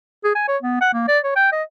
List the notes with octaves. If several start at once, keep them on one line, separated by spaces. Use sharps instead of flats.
G#4
G#5
C#5
B3
F#5
A#3
D5
C#5
G5
D#5